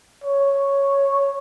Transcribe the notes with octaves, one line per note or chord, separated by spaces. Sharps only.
C#5